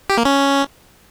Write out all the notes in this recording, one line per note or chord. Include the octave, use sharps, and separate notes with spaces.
G4
A#3
C#4